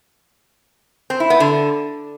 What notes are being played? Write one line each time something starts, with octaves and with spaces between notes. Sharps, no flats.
C4
E4
B3
D3